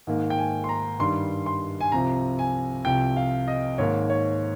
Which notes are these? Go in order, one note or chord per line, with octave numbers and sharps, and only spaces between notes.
G#2 D#3 A#3
G5
G#5
C6
A#5
G2 D#3 G3 C6
C6
G#5
C2 C3 F3 A#5
G#5
C2 C3 F3 G5
F5
D#5
G#2 D#3 A#3 C#5
C#5